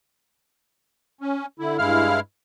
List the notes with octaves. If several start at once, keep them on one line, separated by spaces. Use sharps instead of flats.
C#4
D3 E4
G2 G#3 E4 F5 F6